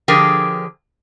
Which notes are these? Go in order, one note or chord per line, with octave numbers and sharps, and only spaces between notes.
D3 F3 G4 G#4 A#4